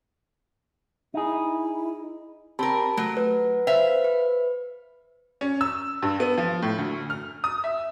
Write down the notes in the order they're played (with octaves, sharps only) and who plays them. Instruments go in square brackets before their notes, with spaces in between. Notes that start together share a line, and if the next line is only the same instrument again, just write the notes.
[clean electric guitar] D#4 G#4 [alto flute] E4
[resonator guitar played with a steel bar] C4 A#4 [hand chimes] G4 A5 B5
[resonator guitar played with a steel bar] F#3 [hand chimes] A3
[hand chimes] B4
[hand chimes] B4 C5 [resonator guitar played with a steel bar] E5 F5
[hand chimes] B4
[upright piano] C#4
E6
G2
B3
F3
A2
D2
F6
D#6
E5